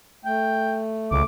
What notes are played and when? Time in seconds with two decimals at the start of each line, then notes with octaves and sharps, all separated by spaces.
0.25 A3 G5
1.11 C#2 D6